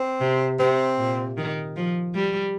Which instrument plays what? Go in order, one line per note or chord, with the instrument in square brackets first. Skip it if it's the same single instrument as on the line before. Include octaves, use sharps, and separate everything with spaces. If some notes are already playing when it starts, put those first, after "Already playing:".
Already playing: [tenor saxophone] C4
[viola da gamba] C3
[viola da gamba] C3 [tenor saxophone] C4
[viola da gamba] A#2
D#3
F3
G3